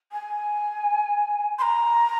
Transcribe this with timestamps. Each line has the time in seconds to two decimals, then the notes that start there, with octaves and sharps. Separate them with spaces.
0.12 G#5
1.58 C6
1.61 A#5